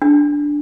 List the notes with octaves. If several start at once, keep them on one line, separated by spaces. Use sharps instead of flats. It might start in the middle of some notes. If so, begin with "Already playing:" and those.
D4